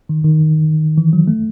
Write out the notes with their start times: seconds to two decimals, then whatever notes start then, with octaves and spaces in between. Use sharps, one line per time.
0.09 D#3
0.25 D#3
0.98 E3
1.13 F#3
1.28 A3